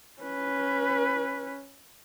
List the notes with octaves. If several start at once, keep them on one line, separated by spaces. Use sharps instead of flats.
C#4 B4